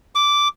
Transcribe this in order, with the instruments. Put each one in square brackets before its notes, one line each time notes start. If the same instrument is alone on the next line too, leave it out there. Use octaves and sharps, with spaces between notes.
[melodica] D6